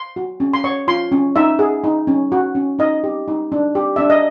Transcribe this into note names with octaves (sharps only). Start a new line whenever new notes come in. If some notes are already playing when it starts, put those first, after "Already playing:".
Already playing: C6
F#4
C#4
C6
C#5 C#6
F4 C6
C#4
D#4 E5
G#4
D#4
C#4
F#4
C#4
D#4 D#5
G4
D#4
D4
G4
D4 E5
D#5